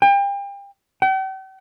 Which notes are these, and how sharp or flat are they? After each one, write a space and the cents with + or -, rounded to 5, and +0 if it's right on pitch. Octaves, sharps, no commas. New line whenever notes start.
G5 +35
G5 -45